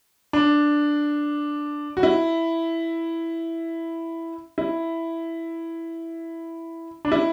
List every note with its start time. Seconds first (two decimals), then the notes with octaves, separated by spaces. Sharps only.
0.33 D4
1.97 F#4
2.03 E4
4.58 E4
7.05 D4
7.12 E4